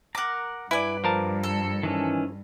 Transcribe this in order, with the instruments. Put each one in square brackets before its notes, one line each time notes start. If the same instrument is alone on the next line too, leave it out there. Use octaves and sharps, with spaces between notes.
[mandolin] A#4 D6 [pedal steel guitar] F#5 A#5
[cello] G2 [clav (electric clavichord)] E4 G#5 [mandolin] B4 D5
[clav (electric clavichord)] F3 A#4 A5
[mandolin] A4
[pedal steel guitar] D#3 E3 C#4